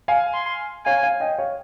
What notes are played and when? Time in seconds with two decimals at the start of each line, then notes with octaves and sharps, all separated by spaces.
0.08 F5 G#5
0.34 C6
0.86 C#5 F5 G#5
1.03 F5 G#5
1.20 D#5 G5
1.38 C#5 F5